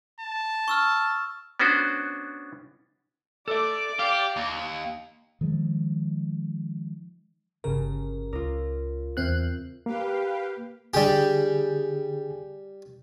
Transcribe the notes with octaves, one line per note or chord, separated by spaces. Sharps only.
A5
C#6 E6 F6
B3 C#4 D4 F#4 C5
A4 D5 E5 D6
G4 F5
D#2
D#3 F3 G#3
G1 C#3 A#4
C#2 F4 A#4
E2 C4 F#6
A#3 G4 B4 F5
D3 G3 G4 G#4 G#5